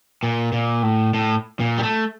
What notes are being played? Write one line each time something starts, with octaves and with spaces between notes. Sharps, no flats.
A#2
A#2
A2
A2
A#2
G3
A3